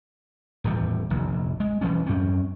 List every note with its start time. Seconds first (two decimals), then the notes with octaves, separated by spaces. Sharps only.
0.64 D#1 E2 A2 G3
1.10 F1 A#1
1.60 G#3
1.81 E1 E3 G3 C#4
2.06 F#2 C4 C#4